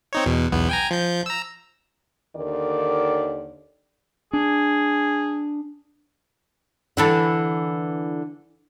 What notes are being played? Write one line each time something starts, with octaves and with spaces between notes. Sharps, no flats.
C4 D#4 C#5
E2 B2
B1 E2 B3
G5 G#5 A#5
F3 G6
A#5 E6
D#2 D3 D#3 D5
D4 G#4
D3 E3 A4